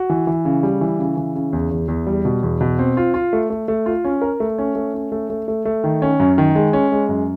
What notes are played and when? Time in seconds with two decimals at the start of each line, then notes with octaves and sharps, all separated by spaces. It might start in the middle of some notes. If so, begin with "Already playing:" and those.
Already playing: F#4
0.10 E3
0.27 E3
0.45 C#3
0.63 G3
0.81 E3
0.99 C#3
1.17 E3
1.35 C#3
1.53 E2
1.71 E2
1.88 E2
2.07 G3
2.25 B2
2.43 E2
2.61 B2
2.79 C4
2.97 F4
3.14 F4
3.33 A3
3.50 A3
3.68 A3
3.86 F4
4.05 C#4
4.21 A#4
4.40 A3
4.58 C#4
4.75 A3
4.94 C#4
5.12 A3
5.30 A3
5.48 A3
5.65 A3
5.84 D#3
6.02 C#4
6.20 F#2
6.38 D#3
6.55 G#3
6.73 C#4
6.92 G#3
7.09 F#2